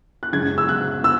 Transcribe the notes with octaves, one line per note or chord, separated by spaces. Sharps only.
F#6
F#2 C#3 G#3 G#6
E6
F#6
E6